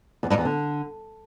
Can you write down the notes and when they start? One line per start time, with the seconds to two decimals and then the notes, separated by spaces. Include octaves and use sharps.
0.23 E2
0.30 G2
0.38 E2
0.45 D3